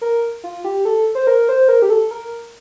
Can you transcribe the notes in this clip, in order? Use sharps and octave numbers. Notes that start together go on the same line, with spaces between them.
A#4
F4
G4
A4
C5
A#4
C5
A#4
G4
A4
A#4